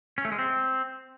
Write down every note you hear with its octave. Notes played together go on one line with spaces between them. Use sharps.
C#4
A3
G#3
C4